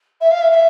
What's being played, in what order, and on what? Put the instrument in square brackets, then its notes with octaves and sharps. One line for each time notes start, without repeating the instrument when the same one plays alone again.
[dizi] E5
F5
E5
E5